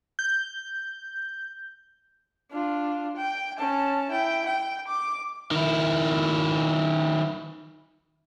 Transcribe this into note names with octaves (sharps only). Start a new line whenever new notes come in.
G6
D4 F4
G5
C#4 A5
E4 G5
G5
D6
D#3 E4